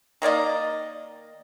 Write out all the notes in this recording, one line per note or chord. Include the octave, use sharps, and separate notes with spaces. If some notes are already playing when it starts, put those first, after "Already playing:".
D#3 A#3 D5 D#5